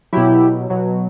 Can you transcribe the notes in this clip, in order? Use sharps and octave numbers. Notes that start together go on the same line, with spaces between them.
B2 F#3 E4 G4
B2 F#3